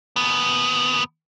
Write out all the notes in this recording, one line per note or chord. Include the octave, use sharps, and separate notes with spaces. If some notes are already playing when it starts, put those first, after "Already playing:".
D#2 B3